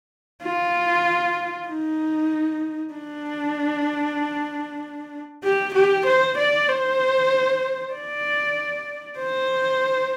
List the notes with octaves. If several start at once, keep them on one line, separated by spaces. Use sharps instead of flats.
F4
D#4
D4
G4
G4
C5
D5
C5
D5
C5